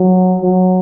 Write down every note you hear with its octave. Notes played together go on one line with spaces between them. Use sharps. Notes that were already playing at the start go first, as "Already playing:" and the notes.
Already playing: F#3
F#3